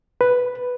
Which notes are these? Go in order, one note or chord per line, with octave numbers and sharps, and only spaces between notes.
B4